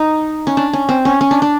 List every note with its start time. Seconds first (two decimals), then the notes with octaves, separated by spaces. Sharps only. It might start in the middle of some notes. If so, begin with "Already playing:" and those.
Already playing: D#4
0.47 C#4
0.57 D4
0.73 C#4
0.89 C4
1.05 C#4
1.21 C#4
1.31 D4
1.42 D4